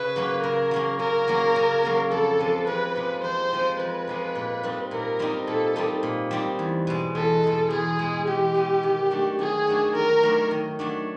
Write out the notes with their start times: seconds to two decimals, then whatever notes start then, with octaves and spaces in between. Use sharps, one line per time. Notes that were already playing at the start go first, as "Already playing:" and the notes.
Already playing: C#3 B4
0.16 F#3 A#3 C#4
0.43 C#3 A#4
0.71 F#3 A#3 C#4
0.99 C#3 A#4
1.28 F#3 A#3 C#4
1.56 C#3
1.83 F#3 A#3 C#4
2.11 F2 A4
2.40 C3 F3 G#3
2.67 F2 B4
2.96 C3 F3 G#3
3.23 F2 C5
3.52 C3 F3 G#3
3.79 F2 B4
4.07 C3 F3 G#3
4.35 A#2
4.63 G3 C4 D#4
4.91 A#2 A#4
5.19 G3 C4 D#4
5.47 A#2 A4
5.76 G3 C4 D#4
6.03 A#2
6.31 G3 C4 D#4
6.59 E2
6.87 B2 G#3
7.15 E2 A4
7.44 B2 G#3
7.70 E2 G#4
7.99 B2 G#3
8.27 E2 G4
8.55 B2 G#3
8.83 D#3
9.10 F#3 A3 D4
9.39 D#3 G#4
9.67 F#3 A3 D4
9.95 D#3 A#4
10.23 F#3 A3 D4
10.51 D#3
10.79 F#3 A3 D4